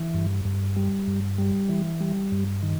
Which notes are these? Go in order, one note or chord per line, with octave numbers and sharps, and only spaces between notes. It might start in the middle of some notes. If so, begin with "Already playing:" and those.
Already playing: E3
G2
G2
G3
G2
G3
E3
G3
G2
D#3